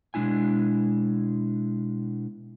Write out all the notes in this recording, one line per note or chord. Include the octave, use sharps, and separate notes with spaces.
B2 G#3 D4 E4 G#5